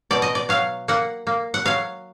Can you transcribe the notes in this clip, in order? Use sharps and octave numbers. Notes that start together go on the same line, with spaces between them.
B2 D5
D#5
D5
F#3 F5
A#3 F#5
A#3
F#5
F#3 F5